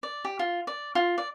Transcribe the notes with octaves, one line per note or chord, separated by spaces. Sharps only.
D5
G4
F4
D5
F4
D5